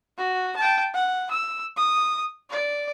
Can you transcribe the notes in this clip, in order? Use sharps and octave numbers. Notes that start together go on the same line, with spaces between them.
F#4
G5 A5
F#5
E6
D#6
D5